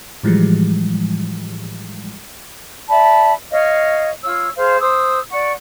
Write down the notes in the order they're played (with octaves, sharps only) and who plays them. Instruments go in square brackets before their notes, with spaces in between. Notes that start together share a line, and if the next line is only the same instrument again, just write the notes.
[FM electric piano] A2 E3 F3 G3 G#3
[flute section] D5 E5 A5 B5
C#5 D#5 F5
F4 C#5 E6
G#4 C5 F5
C5 D#6 E6
D5 F#5 C#6